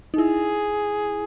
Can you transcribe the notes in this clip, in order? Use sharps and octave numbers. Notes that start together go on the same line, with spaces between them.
D#4
E4 G#4